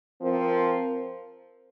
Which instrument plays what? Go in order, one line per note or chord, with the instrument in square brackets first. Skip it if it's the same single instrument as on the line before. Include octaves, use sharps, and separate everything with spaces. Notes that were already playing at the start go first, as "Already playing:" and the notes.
[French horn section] F3 C4 F4 A#4